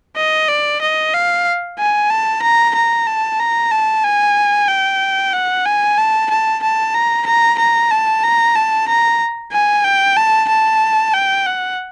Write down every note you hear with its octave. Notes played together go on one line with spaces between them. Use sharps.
D#5
D5
D#5
F5
G#5
A5
A#5
A#5
A5
A#5
A5
G#5
G5
F#5
G#5
A5
A5
A5
A#5
A#5
A#5
A5
A#5
A5
A#5
G#5
G5
A5
A5
G5
F#5